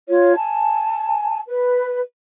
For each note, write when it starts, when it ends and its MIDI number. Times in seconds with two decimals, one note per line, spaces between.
0.08 0.36 65
0.08 0.36 73
0.37 1.39 80
0.37 1.39 81
1.47 2.01 71